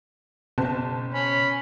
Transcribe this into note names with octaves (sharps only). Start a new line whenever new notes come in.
F#1 B2 A5
C#4 B5